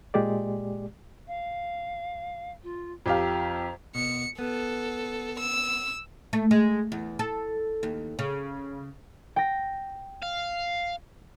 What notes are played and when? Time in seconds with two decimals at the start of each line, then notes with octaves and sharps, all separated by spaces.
0.14 A#2 G#3 G4 G#4 D5
1.27 F5
2.63 F4
3.06 F2 G4 F5 A#5
3.95 B2 C#7
4.39 B3 A4
5.39 E6
6.33 A3
6.51 G#3
6.92 E2
7.19 A4
7.83 D#2
8.19 C#3
9.36 G5 A#6
10.22 F5